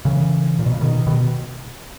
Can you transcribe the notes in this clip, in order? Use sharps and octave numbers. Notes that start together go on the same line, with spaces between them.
C#3 E3
A#2
B2
C#3
B2 D#3
B2 D#3